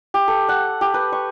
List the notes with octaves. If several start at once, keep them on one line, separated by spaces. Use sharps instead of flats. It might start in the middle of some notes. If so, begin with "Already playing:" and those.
G4
A4
F#5
G4
B4
C#6